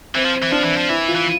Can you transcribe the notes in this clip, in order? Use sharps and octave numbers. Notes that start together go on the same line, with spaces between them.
E3 C4
F3
E3
F3 D4
E3
F3
E3 E4
F4
E3